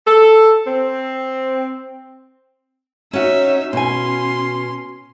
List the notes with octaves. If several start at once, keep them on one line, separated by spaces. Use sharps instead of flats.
A4
C4
C#4 D#4 F#4 E5
B2 C#4 G#5 C6